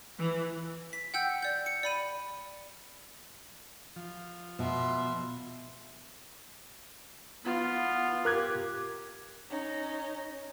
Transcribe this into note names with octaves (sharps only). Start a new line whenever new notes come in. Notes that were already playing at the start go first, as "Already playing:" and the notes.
E3
B6
F#5 G5 E6 G6
D5 G6
C#7
D5 B5 D#7
F3
B2 E5 C6
B3 F4
G4 A#4 F#6 G#6
C#4 D#4